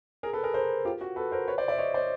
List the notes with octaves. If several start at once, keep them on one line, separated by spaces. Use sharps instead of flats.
G#4 A#4
A4 B4
G#4 A#4
A#4 C5
F4 G4
F#4
A4 B4
A#4 C5
B4 C#5
C5 D5
D5 E5
C#5 D#5
C5 D5